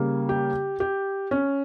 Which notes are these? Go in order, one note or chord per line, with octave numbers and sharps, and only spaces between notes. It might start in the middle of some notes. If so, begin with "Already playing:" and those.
Already playing: C#3 G3 A#3
G4
G4
C#4